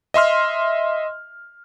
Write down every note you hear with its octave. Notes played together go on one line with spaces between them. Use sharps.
D#5 E5 C6 F6